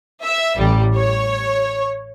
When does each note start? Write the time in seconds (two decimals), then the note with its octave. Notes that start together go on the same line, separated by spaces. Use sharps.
0.25 E5
0.59 A1 G3
0.97 C#5